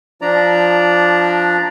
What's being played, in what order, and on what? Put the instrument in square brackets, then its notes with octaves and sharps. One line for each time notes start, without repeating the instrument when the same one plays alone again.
[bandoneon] F3 D4 D5 A#5